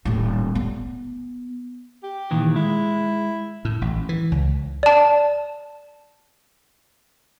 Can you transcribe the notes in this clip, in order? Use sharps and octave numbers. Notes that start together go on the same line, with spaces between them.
D#1 A2
B3
G4
A#2 D#3 E3
G#3 E4
A2
A1
E3
C#2
D5 A5